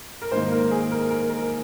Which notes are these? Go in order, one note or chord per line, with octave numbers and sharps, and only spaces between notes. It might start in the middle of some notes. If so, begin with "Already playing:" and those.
A#4
G#2 D#3 A#3 C5
A#4
G#4
A#4
A#4
A#4